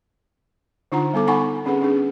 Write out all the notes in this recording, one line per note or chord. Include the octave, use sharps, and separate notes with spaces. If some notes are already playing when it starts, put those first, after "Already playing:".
D3 D4 D#4 F4 F#5 A#5
G3 B3 A4 D6
B3 D#4 F#5 G#5 B5 C#6
C4 C#4 G#4 B4 F#5
C#4 D4 G#4